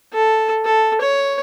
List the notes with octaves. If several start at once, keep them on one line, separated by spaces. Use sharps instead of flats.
A4
A4
C#5